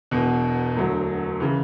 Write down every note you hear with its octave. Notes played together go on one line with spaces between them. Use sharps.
E1 E2 B2
E1 D2 D3 F#3
C#3 E3